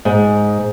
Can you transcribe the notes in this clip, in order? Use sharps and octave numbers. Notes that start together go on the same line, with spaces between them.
G#2